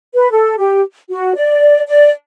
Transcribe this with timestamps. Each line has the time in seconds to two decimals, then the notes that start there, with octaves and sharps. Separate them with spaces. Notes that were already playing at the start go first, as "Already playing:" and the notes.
0.14 B4
0.31 A4
0.58 G4
1.10 F#4
1.36 D5
1.87 D5